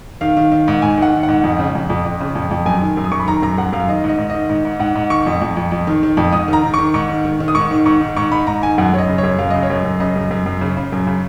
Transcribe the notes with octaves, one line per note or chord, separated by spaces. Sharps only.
D#3 F5
D#3
D#3
G#2
G#2 G#5
D#3 F#5
D#3
F#5
G#2
F2
C#3
F2
F2
F2
C#3
F2
F2
F#2 G#5
D#3
F#2
D#6
F#2 C#6
B5
D#3 A#5
F#2 A#5
F#2 F#5
F#2 F5
D#3 D#5
G#2 D#5
G#2
D#3 D#5
G#2
G#2
G#2 F#5
G#2
D#3 C#6
F2
F2
F2
F2
D#3
D#3
F2
G#2 D#6
D#3 A#5
D#3
D#3 C#6
G#2 C#6
D#3
D#3
D#3
D#6
G#2 C#6
D#3
G#2 C#6
D#3
G#2 C#6
G#2 B5
G#2 A#5
D#3 G#5
F#2 F#5
F#2 C#5
D#5
C#3
C#5
F#2
F#2 F5
C#3 D#5
C#5
F#2 D#5
F#2
C#3 D#5
F#2
F#2
F#2
C#3
C#3
F#2
C#3